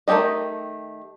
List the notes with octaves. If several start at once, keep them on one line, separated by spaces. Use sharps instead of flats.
D#3 A3 C#4 G4 D#5